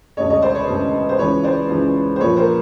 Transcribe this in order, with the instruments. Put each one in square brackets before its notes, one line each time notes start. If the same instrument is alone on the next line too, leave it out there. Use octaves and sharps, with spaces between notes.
[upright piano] E1 D2 C#3 C#5 D#5
C#5 D#5
C5 D5
B4 C#5
E1 D2 C#3
C5
C#2 C#3 E3 B4 C#5
C5 D5
C#2 C#3 E3
C5
A#1 A#2 F3 B4 C#5
A#4 C5